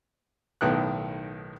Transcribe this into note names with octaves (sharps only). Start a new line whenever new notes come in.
B1 A2 D#3 B3 F#6